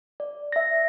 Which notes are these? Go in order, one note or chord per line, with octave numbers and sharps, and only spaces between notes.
D5
E5 A#6